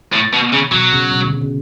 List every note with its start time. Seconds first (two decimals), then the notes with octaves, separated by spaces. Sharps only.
0.13 A2
0.33 B2
0.52 C#3
0.71 B2 F#3
0.92 C#3
1.12 B2
1.24 D3
1.31 C#3
1.41 C#3